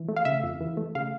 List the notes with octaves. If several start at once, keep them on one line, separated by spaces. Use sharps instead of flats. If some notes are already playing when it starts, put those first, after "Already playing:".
Already playing: E3
A3
F5
C#3 E5
F2
E3
A3
C#3 F5